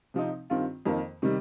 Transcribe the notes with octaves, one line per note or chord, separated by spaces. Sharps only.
C3 F3 C4 D#4
G2 D#3 C4 F4
F2 D#3 A#3
C3 D#3 G3